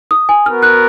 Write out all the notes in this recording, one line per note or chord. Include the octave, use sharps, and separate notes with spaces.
D#6
G#5
B3 F#4 A#4 F6
F#6